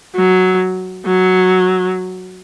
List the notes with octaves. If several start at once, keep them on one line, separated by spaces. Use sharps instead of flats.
F#3
F#3